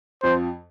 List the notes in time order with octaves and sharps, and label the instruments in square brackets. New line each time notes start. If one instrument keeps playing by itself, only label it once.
[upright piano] F2 F3 [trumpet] C5